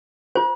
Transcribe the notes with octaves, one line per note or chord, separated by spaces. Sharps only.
F4 C5